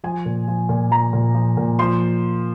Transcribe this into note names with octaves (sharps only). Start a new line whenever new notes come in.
F3 G#5
A#2
F3
A#2
F3 A#5
A#2
F3
A#2
F3 C6